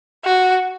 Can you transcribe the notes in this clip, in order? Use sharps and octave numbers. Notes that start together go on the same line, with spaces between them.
F#4